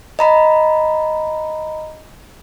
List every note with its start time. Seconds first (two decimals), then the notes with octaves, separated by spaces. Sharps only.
0.19 D#5 A#5 B5